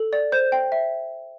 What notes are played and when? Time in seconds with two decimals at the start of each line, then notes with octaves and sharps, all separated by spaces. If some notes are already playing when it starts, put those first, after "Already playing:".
Already playing: A4
0.13 D5
0.32 C5 G6
0.52 G5
0.72 E5